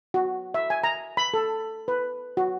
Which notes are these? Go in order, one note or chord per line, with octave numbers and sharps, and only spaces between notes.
F#4
E5
G#5
A#5
B5
A4
B4
F#4